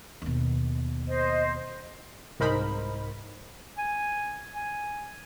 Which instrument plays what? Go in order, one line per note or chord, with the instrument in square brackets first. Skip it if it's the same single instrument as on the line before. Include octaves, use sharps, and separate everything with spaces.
[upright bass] D#2 B2
[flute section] C5 D#5
[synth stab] C2 G#2 D#4 A#4 C5 B5
[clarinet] G#5
G#5